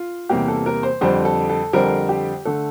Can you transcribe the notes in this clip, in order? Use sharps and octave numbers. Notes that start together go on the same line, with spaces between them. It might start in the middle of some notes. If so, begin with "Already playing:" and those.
Already playing: F4
E2 C3 G3 A#3 G4
A4
A#4
C5
F2 D3 G3 C4 C5
A4
A4
F2 D3 G3 C4 A#4
G4
D3 A3 A4